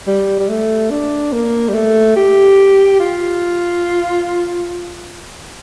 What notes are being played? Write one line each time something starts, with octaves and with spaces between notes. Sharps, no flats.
G3
G3
A3
D4
A#3
G3
A3
G4
F4